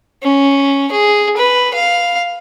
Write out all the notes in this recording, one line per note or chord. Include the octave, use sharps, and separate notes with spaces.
C#4
G#4
B4
F5